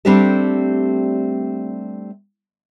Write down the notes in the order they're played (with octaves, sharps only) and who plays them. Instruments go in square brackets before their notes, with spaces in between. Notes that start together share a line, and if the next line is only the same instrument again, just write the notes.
[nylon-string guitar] G3 A3 C4 D4 G4 A4